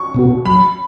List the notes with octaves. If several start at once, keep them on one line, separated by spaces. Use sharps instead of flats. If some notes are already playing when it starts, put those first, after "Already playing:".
Already playing: C#6
B2 B3 F#4
F#3 B5